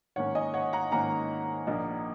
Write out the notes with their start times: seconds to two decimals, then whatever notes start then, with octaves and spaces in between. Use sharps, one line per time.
0.16 G#2 D#3 A#3 C#4 C#5 F#5
0.35 D#5 G#5
0.54 C#5 F#5
0.73 F#5 A#5
0.92 G#2 D#3 A#3 C#4 F#5 A#5
1.67 A#1 A#2 A#3 D#4